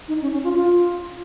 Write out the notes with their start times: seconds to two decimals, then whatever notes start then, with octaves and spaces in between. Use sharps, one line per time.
0.08 D#4
0.22 C#4
0.33 C#4
0.44 F4
0.55 F4